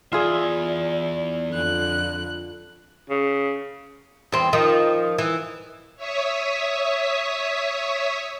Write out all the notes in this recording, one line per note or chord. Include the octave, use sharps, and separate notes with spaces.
E2 F4 G#4 D5 E5
F2 D3 F#6
C#3
E2 C4
D#3 F3
E3
C#5 E5 C#6 D#6 B6